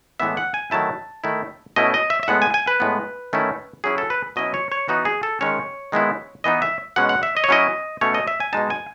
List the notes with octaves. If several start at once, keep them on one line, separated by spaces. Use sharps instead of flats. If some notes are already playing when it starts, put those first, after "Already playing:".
A2 E3 G#3 B3 E5
F#5
G#5
D#3 F#3 A3 E4 A5
D#3 A3 E4
B2 A3 C#4 E4 D#5
D#5
E5
E5
A2 G#3 B3 F#5
G#5
G#5
B4
A2 G#3 B3
D#3 A3 C#4 E4
F#3 C#4 E4 G#4
A4
B4
B2 F#3 C#4 E4 D#5
C#5
C#5
E3 B3 D#4 F#4
G#4
A4
D#3 G#3 C#4 C#5
D#3 G#3 B3 E4
E3 B3 D#4 D#5
E5
B2 G#3 C#4 F#5
F#5
E5
D#5
C#5
F#3 C#4 E4 D#5
B2 A3 C#4 C#5
D#5
E5
G#5
B2 G#3 D#4 A5
G#5